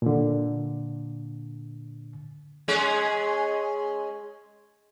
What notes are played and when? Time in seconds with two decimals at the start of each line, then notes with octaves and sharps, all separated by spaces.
0.02 A#2 D3
2.68 G#3 C#4 G#4